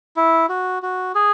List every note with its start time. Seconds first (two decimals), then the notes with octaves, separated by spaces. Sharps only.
0.17 E4
0.49 F#4
0.83 F#4
1.15 G#4